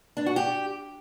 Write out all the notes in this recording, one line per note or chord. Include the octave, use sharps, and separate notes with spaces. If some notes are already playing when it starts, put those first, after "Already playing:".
D4
F#4
G4